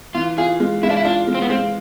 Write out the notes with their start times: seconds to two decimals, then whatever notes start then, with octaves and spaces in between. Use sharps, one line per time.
0.15 E3 F4
0.38 F4 G#4
0.60 G#3
0.83 G#3 E4
0.90 D4
0.97 E4
1.05 D4 F4
1.27 G#3
1.34 C4
1.42 B3
1.49 G#3 C4